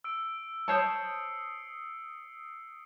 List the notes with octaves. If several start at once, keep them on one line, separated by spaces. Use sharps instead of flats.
E6 D7
C5 C#5 A5 D#6 C7 C#7